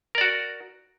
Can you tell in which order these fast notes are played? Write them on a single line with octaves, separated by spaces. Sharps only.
A#4 D5 F#4